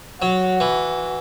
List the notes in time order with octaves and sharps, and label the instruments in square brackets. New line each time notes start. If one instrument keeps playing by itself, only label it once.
[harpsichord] F#3 [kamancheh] F#4
[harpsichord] E3